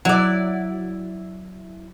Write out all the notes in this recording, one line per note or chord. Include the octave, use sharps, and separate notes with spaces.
F#3 E4 D5